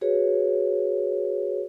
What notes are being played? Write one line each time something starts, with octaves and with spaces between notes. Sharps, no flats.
F#4 G#4 B4 C#5